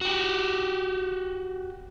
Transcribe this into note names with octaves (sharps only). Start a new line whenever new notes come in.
F#4 G4